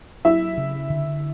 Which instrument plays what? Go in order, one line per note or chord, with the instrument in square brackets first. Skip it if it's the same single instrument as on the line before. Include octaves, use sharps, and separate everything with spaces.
[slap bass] F#3 [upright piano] E4 E5
[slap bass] C#3
D3